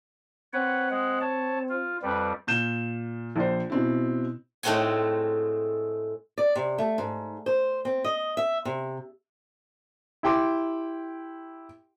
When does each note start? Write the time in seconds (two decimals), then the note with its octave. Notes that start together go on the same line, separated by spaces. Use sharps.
0.53 C4 B4 C#5 F#5
0.90 G#3 F#5
1.20 C#5 A5
1.69 F4
2.02 F2 G3 B4
2.47 A#2 G6 E7
3.36 A#1 C5
3.70 B2 C4 E4
4.63 A2 G#3 A3 C4 F#4 G#5
6.38 D5
6.55 C3
6.78 A3
6.98 G#2
7.46 C5
7.85 C4
8.04 D#5
8.37 E5
8.65 C3
10.23 E4 G4 G5 C6 D6